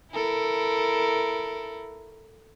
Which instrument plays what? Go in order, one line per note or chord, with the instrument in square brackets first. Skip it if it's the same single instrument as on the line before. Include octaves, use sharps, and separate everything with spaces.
[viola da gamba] E4 A4 A#4